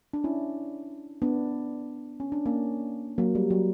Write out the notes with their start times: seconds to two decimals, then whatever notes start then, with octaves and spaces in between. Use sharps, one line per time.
0.13 D4
0.24 C#4 E4
1.22 B3 D4
2.20 C#4
2.32 D4
2.46 A#3 C#4
3.18 F#3 A#3
3.35 G3
3.50 F#3